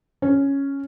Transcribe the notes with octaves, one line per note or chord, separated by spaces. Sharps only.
C#4